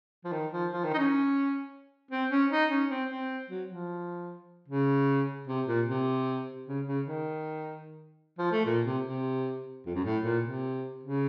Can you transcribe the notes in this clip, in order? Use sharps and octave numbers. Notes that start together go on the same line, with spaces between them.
F3
D#3
F3
F3
D#3
D#4
C#4
C4
C#4
D#4
C#4
C4
C4
F#3
F3
C#3
C3
A#2
C3
C#3
C#3
D#3
F3
A3
A#2
C3
C3
F2
F#2
A2
A#2
C3
C#3